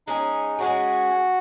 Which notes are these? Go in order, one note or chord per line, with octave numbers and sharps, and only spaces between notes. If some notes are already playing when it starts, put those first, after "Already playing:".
G#3 C#4 D#4 G#4
G#3 C#4 F#4 G#4